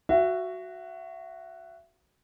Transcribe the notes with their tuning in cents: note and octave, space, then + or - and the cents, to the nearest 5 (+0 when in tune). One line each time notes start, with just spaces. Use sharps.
F#4 +0 E5 +30